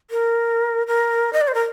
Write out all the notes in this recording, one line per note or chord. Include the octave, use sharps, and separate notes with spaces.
A#4
A#4
D#5
D5
C5
A#4